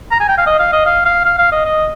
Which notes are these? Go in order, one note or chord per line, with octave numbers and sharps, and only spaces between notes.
A#5
G#5
G5
F5
D#5
F5
D#5
F5
F5
F5
F5
D#5
D#5